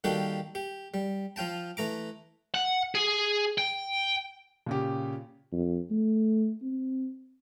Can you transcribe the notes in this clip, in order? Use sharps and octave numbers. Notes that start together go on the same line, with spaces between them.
D#3 G3 A#3 F#4 G4 A4
G4
G3
F3 F4 G5 A5
E3 A3 A#5 D6
F#5
G#4
G5
A#2 C#3 G4
F2
A3
C4